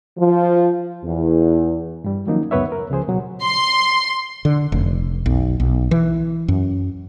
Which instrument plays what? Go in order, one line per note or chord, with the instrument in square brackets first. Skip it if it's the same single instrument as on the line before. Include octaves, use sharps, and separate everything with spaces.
[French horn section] F3
E2
[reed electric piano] G2 G3
D#3 F3 F#3 A#3 C#4 D#4
C#2 F#2 B3 B4 C#5 E5
A#4
C#2 C#3 F3 G#4 C5
B2 F#3
[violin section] C6
[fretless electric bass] D3
F1
B1
B1
E3
F#2